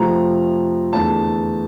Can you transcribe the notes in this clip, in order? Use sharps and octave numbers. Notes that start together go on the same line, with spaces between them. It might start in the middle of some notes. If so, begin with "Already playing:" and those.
Already playing: F2 C3 F3 A3 A#5
E2 D3 A3 A5